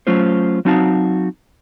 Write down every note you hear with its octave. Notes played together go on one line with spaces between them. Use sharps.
F#3 A3 C#4 F4 C5
F#3 C4 D#4 F#4 F5 A5